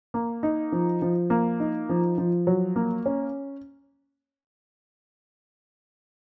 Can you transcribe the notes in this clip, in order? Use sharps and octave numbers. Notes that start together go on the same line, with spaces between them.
A#3
D#4
F3
F3
A#3
D#4
F3
F3
F#3
A#3
C#4